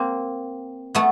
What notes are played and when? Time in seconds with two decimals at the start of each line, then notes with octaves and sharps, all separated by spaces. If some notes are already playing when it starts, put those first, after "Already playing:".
Already playing: A#3 C4
0.95 A3 B3